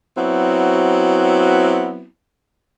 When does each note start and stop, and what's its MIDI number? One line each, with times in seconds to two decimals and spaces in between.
0.16 2.06 54
0.16 2.06 59
0.16 2.06 60
0.16 2.06 64
0.16 2.06 66